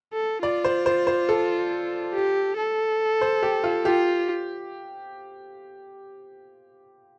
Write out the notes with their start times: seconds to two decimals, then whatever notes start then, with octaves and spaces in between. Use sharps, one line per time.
0.14 A4
0.43 F4 D5
0.64 C5
0.86 C5
1.07 C5
1.29 A4
2.14 G4
2.57 A4
3.21 C5
3.43 G4
3.64 F4
3.85 F4 G4